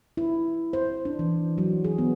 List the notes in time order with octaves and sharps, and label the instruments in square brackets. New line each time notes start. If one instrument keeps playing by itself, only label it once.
[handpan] E4
C5
D4
E3
F#3
G#4
B3